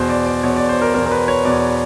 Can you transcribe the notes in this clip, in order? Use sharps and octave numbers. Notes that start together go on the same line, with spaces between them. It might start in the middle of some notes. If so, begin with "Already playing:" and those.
Already playing: E2 B2 C5
D5
D5
E2 B2 C#5
D5
C5
A#4
E2 B2 A#4
A#4
B4
C#5
E2 B2 D5